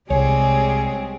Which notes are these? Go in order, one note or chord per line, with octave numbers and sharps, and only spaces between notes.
C2 G3 G#3 C4 G#4 C#5